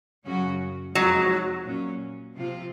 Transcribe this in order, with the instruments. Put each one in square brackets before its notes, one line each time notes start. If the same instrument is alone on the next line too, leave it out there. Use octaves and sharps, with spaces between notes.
[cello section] F#2 C#3 F#3 C#4 F#4
[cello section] F2 C3 F3 G#3 D#4 [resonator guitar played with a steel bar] F#3
[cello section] A#2 F#3 C#4
C3 F3 C4 F4